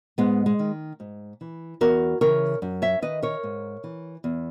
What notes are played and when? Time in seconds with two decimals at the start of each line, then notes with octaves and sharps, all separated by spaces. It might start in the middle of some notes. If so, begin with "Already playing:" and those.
0.18 G#2 G#3 B3
0.46 G#3
0.59 D#3
1.00 G#2
1.41 E3
1.81 E2 F#4 A#4
2.21 C#3 E3 A#4 C#5
2.62 F#2
2.82 C#5 E5
3.02 D#3 B4 D#5
3.23 A#4 C#5
3.43 G#2
3.84 E3
4.24 E2